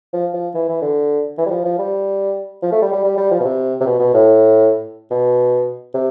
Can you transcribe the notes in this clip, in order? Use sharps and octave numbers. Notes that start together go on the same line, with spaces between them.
F3
F3
E3
E3
D3
E3
G3
F3
F3
G3
F3
A3
G3
G3
G3
G3
F3
B2
C3
C3
B2
B2
A2
B2
C3